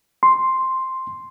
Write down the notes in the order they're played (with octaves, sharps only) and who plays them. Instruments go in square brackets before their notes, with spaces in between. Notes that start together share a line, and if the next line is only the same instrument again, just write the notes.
[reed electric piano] C6